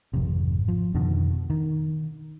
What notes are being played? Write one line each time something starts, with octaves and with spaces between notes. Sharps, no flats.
G#1 F2 C3
F3
F2 B2 D3 D#3
D#3